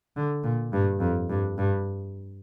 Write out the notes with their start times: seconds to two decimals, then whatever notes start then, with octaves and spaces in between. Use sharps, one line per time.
0.16 D3
0.44 A#2
0.73 G2
1.00 F2
1.29 G2
1.58 G2